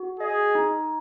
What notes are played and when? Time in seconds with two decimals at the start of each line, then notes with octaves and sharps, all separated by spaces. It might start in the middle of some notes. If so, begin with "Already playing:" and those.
Already playing: F#4
0.19 G#4 D#5
0.55 D#4